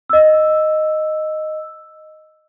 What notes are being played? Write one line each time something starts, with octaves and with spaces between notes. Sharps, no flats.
D#5 E6